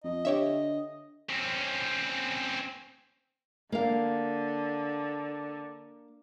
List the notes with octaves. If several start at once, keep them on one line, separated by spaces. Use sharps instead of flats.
F2 D#5
D3 G4 C#5 E5
C4 C#4
D3 A#3 F5